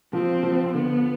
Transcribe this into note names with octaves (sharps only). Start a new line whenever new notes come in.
F3 C4
F3
D3 B3